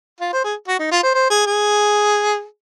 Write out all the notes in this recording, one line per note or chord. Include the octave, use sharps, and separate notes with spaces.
F4
C5
G#4
F#4
D#4
F4
C5
C5
G#4
G#4